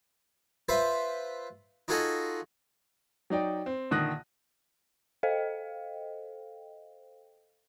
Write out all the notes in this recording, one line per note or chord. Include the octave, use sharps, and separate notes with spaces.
F4 B4 C5 E5
D#4 F4 F#4 G#4 A4 D#5
F#3 D#4 D5 G5
C4
A#1 D3 D#3 D#6 F#6 A#6
A4 C5 D#5 F5 G5